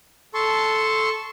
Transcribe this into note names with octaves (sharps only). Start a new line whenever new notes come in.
A4 A5 C6 C#6